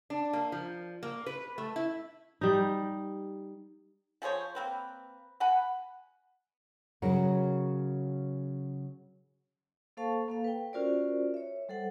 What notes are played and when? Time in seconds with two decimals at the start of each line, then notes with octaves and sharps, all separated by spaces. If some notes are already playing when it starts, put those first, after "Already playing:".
0.10 D4
0.33 A#3
0.52 F3
1.03 A#3
1.26 B4
1.58 A3
1.76 E4
2.41 G3 D#4
4.22 F3 G#4 C5 C#5
4.55 A#3 C4 B4
5.40 F#5 G#5 B5
7.02 C#3 F#3 C#4 F#4 G#4 A#4
9.97 A#3 A4 C5 F5 A5 C#6
10.28 A#3 A4 F5
10.44 B4 G5
10.73 C#4 F4 F#4 A#4 C5 D5
11.34 C#5 E5
11.69 G3 A4 C5 F#5